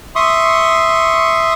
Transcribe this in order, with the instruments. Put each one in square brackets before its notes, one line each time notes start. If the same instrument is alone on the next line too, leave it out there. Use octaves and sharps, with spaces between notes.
[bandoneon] E5 C6 C#6 D#6